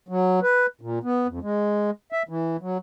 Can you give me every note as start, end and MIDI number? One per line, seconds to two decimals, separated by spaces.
0.08 0.40 54
0.43 0.66 71
0.81 0.99 46
1.04 1.27 59
1.27 1.39 41
1.42 1.90 56
2.13 2.23 76
2.29 2.57 52
2.61 2.78 54